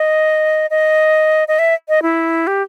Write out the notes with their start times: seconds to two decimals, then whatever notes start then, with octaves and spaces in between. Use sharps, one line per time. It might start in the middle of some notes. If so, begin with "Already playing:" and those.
Already playing: D#5
0.70 D#5
1.48 D#5
1.59 E5
1.89 D#5
2.02 E4
2.47 G4